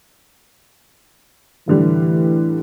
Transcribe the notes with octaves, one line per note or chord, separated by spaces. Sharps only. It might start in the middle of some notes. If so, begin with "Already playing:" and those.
A2 D3 E3 G3